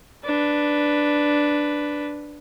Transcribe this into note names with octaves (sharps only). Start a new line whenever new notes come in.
D4 B4